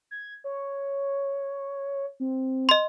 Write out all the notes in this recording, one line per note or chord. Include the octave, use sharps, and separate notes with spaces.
G#6
C#5
C4
D#5 C6